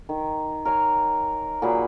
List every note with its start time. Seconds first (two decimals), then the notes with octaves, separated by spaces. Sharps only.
0.09 D#3
0.65 A#4 C#5 F5 G#5
1.62 A#2 F#3 G#4 B5